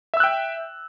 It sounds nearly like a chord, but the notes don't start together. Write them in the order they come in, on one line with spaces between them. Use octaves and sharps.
E5 E6 F#6 G5